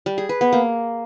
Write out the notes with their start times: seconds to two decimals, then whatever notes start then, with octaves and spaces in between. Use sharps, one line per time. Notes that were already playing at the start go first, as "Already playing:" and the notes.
0.06 G3
0.18 G#4
0.29 B4
0.41 B3
0.53 A#3